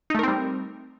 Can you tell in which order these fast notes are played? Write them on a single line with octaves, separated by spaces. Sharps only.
D#4 A3 A#4 C4 G3